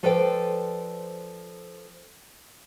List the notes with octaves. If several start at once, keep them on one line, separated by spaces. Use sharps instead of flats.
F3 A4 B4 C5 D5 G5